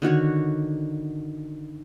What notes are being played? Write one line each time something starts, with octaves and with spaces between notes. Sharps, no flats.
D3 D#3 F#4 C#5